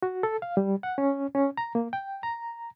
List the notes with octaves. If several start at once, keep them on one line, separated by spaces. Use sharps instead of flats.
F#4
A4
F5
G3
F#5
C#4
C#4
A#5
A#3
G5
A#5